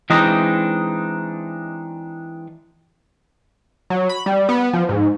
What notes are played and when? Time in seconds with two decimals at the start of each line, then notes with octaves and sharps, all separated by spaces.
0.10 E3 G#3 C4 D4 D#4 D#5
3.90 F#3
4.09 B5
4.26 G3
4.49 B3
4.73 F3
4.89 G#2